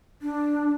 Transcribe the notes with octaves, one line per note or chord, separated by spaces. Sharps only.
D4